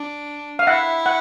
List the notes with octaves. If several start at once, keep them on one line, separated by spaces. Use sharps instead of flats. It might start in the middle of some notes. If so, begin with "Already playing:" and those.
Already playing: D4
F5
E4 E5 F#5
F#5